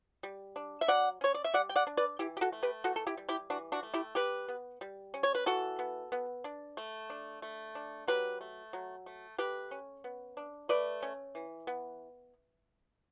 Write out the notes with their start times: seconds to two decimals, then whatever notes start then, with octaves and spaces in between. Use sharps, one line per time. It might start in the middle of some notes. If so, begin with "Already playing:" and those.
0.23 G3
0.56 D4
0.81 E5
0.88 F#3 D5 F#5
1.21 C#4 C#5
1.34 D5
1.44 E5
1.54 G3 D5 F#5
1.69 G5
1.76 D5 F#5
1.87 D4
1.97 B4 D5
2.19 E3 E4 G4
2.37 G4
2.41 F#4 A4
2.52 A3
2.63 G4 B4
2.84 E3 F#4 A4
2.96 A4
3.07 E4 G4
3.17 G3
3.29 E4 G4
3.50 E3 D4 F#4
3.72 D4 F#4
3.83 A3
3.94 E4 G4
4.15 G3 G4 B4
4.48 B3
4.81 G3
5.14 C#4
5.23 C#5
5.35 B4
5.46 E3 F#4 A4
5.79 B3
6.12 B3
6.44 D4
6.77 A3
7.10 D4
7.42 A3
7.75 D4
8.07 F#3 G4 B4
8.41 A3
8.73 F#3
9.06 A3
9.38 A3 G4 B4
9.71 C#4
10.04 B3
10.37 D4
10.69 A3 B4 D5
11.02 C#4
11.35 E3
11.67 B3